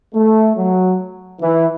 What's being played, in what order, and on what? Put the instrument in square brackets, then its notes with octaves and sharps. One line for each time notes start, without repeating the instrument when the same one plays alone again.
[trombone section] A3
F#3
E3